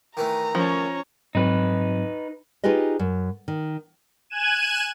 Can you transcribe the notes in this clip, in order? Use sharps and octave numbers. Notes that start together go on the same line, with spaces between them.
D#3 E3 A3 A#5
F3 C#4 C#5
G#2 F#3 C4 D#4 B4
D#4 F4 G4 G#4 B4 D#5
F#2
D#3
G#5 F#6 G#6 D#7 E7